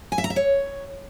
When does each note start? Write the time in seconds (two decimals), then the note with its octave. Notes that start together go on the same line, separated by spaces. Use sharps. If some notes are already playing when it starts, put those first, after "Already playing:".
0.12 G#5
0.18 E5
0.24 A#5
0.30 E5
0.36 C#5